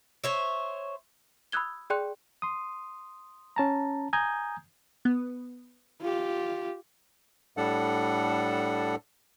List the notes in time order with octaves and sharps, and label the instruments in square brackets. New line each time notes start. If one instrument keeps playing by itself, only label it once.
[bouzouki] C5 C#5 E5
[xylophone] B5 D#6 E6 F#6 G#6 G7
G#4 D5 G5 C6 F#6
[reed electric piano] C6 D#6
C#4 A5 A#5
G#5 A#5 D#6 G6 G#6
[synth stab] B3
[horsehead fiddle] F4 G4
[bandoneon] A2 G3 D4 A4 F#5